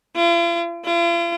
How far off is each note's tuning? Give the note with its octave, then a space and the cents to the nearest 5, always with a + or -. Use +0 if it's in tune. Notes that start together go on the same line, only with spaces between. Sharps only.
F4 -45
F4 -45